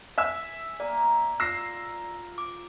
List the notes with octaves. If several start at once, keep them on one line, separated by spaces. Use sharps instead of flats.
E5 G#5 E6
A#3 D5 A#5
F4 E6 A#6 C7
D6